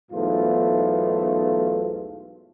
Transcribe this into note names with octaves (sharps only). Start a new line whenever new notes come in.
B1 E2 G#2 A3 F4